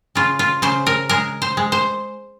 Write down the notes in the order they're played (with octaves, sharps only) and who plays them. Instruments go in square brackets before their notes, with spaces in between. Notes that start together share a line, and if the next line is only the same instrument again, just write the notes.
[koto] C#3 F4
F4
C#3 C5
A#4
G#3 A#4
C5
G#3
C5